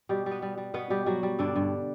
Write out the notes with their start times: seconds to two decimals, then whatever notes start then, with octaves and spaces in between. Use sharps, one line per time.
0.09 B2 G3 G4
0.26 G3
0.31 B3 B4
0.42 G3
0.58 G3
0.74 B2 B3 B4
0.90 B2 G3 G4
1.06 F#3 G3 F#4
1.23 G3
1.39 G2 D3 D4
1.56 G2